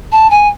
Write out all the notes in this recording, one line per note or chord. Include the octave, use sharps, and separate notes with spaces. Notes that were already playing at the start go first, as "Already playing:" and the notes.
A5
G#5